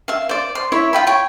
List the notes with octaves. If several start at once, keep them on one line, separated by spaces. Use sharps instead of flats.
E5 F5
C5 D5
C6
E4 C#5 E5
F4 G5 B5
C#5 G5